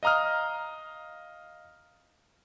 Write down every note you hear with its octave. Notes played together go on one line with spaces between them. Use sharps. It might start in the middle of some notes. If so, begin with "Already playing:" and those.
D#5 F5 A#5 D#6 F6